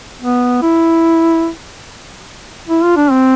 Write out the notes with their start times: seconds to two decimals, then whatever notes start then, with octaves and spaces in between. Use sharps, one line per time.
0.22 B3
0.62 E4
2.69 E4
2.83 F4
2.97 D4
3.11 C4